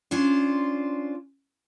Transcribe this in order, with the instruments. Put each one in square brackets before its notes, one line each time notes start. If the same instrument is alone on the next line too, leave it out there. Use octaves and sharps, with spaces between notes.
[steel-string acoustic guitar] C#4 D4 F4 C5